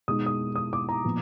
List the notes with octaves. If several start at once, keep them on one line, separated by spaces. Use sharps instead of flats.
B2 G#3 D#4 D#6
D#6
D#6
D6
A#5
A#2 F3 B3